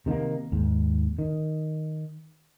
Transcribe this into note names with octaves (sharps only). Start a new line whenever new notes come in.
C3 D#3 G3 A#3
D#2 G#2
D#3